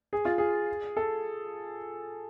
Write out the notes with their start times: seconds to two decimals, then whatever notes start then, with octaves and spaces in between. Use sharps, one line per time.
0.13 G#4
0.25 F4
0.38 G#4
0.97 A4